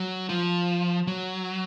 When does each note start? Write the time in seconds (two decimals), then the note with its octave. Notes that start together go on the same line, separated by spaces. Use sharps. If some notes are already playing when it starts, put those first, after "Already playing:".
Already playing: F#3
0.29 F3
1.07 F#3